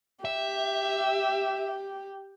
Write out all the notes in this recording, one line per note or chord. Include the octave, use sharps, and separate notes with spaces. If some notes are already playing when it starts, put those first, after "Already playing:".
G4 E5